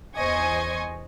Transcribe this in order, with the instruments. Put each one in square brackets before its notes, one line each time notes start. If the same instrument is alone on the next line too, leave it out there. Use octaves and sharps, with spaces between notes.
[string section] E2 C5 D#5 G#5 C#6 G#6